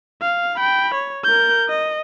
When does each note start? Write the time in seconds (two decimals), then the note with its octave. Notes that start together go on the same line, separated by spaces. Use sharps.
0.22 F5
0.57 G5 B5
0.95 C#5
1.24 A#4 G6
1.69 D#5